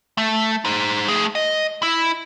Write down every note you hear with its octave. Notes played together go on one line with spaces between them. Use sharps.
A3
D#4 C5
A3 G#4
D#5
E4